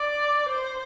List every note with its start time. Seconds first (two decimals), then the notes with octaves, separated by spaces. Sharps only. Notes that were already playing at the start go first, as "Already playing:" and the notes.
Already playing: D5
0.49 C5